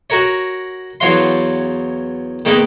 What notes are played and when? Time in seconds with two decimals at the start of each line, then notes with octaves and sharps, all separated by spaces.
0.10 F#4 A#4 C#5
1.00 E2 F#3 C#5 F5 C6
2.45 D#3 G#3 A#3 B3 B4